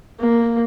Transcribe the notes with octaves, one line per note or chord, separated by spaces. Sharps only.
A#3